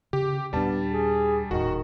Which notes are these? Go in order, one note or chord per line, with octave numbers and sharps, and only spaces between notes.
C#3 G4
D#2 A#2 G3 B3 D4 A5
G#4
D#1 A2 D#3 F#4